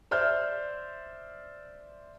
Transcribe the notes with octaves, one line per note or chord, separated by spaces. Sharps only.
C5 D5 E5 F6 G6